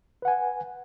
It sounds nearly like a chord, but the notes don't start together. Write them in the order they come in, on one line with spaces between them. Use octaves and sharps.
B4 F#5 G#5